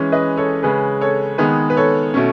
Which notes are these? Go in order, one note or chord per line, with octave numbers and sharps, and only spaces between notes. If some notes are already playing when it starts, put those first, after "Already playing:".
Already playing: E3 G#3 C#4
B4 D#5
A4 C#5
C#3 G#3 C#4 G#4 B4
A4 C#5
D#3 G#3 B3 G#4 B4
B4
A4 C#5
B2 A3 C#4